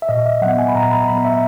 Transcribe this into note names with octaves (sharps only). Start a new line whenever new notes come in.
E5
A#2 D#5
E5
F#3 B3 F#5
G#5
B5
A#2 A#5
B5
F#3 B3 B5
E5